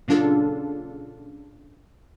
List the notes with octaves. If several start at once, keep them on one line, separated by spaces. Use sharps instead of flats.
A#2 C#3 F#3 D4 F4 A4